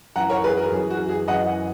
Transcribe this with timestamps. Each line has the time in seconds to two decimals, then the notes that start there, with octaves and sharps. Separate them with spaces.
0.16 F#2 E3 F#5 A#5
0.29 A#4 C#5
0.44 G#4 B4
0.57 F#4 A#4
0.72 F#2 G#4
0.75 E3
0.90 F#4
1.09 G#4
1.28 F#2 E3 D#5 F#5